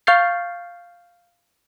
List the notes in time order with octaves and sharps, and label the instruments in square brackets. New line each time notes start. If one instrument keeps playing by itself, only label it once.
[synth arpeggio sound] F5 C#6 F6 G6 A6 C7